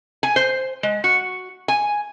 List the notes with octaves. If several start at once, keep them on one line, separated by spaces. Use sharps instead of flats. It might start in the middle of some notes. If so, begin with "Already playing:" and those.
G#5
C5
G#3
F#4
G#5